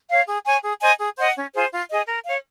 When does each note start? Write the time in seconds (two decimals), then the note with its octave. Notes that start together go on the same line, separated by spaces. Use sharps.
0.09 C#5 F5
0.27 G#4
0.45 C#5 G#5 C#6
0.63 G#4
0.81 C5 D#5 G#5
0.99 G#4
1.17 C5 D#5 F#5
1.35 C#4
1.54 F4 G#4 C5
1.72 F4
1.90 G#4 D#5
2.08 A#4
2.25 C#5 F5